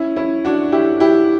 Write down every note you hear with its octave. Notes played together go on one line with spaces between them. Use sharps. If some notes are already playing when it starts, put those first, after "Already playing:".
Already playing: C#4 E4
C#4 E4
D4 F#4
E4 G4
E4 G4